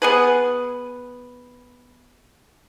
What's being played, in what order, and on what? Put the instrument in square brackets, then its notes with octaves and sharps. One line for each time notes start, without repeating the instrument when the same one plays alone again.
[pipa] B3 G#4 B4